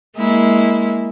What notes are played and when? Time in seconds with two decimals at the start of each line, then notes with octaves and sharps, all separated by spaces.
0.16 G#3 A#3 E4